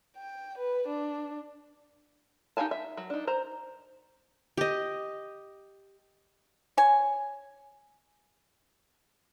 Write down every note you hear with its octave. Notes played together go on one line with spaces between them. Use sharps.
G5
B4
D4
D#4 G4 F5 G#5 A5
E5
F#3
D4 D#4
C5 A#5
G4 D#5
C#5 G#5